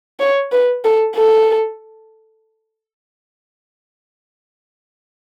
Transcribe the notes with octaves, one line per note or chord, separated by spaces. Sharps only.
C#5
B4
A4
A4